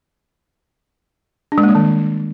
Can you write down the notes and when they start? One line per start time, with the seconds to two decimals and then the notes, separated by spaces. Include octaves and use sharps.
1.52 D4
1.58 G#3
1.63 A#3
1.69 G3
1.75 D#3